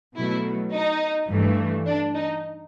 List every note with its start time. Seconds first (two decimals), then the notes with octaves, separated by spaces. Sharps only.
0.16 B2 F#3 A3 E4
0.72 D#4
1.30 G2 E3 A3
1.87 D4
2.15 D#4